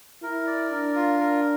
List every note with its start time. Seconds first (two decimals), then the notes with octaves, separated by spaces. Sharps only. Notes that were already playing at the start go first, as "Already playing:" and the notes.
0.22 E4 A#4
0.47 D5
0.71 D4 A#4
0.95 F4
1.19 A#4